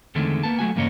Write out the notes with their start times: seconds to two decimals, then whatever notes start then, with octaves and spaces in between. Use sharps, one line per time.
0.15 E2 D3 D#3 G#3 A3 C4
0.43 A#3 B3 A5
0.59 F#3 A3 F#4 G#5
0.76 E2 G2 C#3 A#3 C#5 D#5